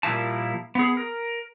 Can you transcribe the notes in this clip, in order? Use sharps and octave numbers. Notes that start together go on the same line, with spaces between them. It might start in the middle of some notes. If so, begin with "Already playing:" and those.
A#2 F3 G3 A#3 E4 A5
B3 G#4
A#4